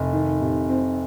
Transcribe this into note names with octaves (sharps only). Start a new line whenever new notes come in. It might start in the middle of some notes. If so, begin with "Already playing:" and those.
Already playing: F1
D#3
C3
C4